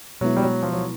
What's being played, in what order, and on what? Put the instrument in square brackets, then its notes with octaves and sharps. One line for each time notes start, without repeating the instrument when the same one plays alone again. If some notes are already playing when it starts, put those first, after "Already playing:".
[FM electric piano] B2 G#3 B3 E4 [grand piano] F#3
[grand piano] G3
F#3
F3
F#3